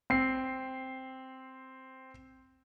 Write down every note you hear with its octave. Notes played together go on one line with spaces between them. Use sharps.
C4 C7